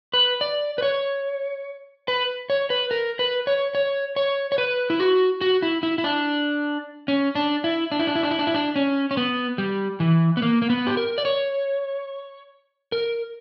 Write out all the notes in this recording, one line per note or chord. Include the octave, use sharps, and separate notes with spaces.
B4
D5
B4
C#5
B4
C#5
B4
A#4
B4
C#5
C#5
C#5
C#5
B4
E4
F#4
F#4
E4
E4
E4
D4
C#4
D4
E4
D4
E4
D4
E4
D4
E4
D4
E4
D4
C#4
C#4
B3
G3
E3
B3
A#3
A#3
B3
G4
A#4
D5
C#5
A#4